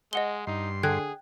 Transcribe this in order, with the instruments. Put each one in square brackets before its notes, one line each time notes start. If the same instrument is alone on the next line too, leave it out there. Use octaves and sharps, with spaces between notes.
[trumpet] G#3 [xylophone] D#5 F#5 G7
[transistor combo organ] G2 C6 [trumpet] D#4
[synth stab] D3 [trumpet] G#4 [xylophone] G5 F#6 G#6